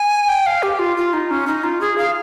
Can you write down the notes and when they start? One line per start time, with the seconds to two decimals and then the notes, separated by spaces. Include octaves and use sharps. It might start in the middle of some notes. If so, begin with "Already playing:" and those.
Already playing: G#5
0.28 G5
0.46 F5
0.63 G4
0.79 F4
0.97 F4
1.13 D#4
1.31 C#4
1.47 D#4
1.64 F4
1.81 G#4
1.98 F5